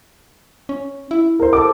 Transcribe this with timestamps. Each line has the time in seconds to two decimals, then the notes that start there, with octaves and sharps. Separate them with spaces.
0.69 C#4
1.11 E4
1.39 A#4 C5
1.53 A4 D6